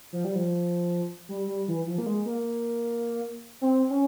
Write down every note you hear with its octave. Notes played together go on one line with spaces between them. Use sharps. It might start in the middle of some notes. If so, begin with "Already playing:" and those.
F3
G3
F3
G3
G3
E3
F3
A#3
G#3
A#3
C4
C#4